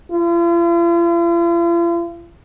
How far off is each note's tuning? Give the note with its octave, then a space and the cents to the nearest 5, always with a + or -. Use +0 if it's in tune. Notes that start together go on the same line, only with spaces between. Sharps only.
F4 -45